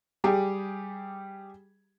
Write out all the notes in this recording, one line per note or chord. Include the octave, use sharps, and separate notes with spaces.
G3 G4 G#4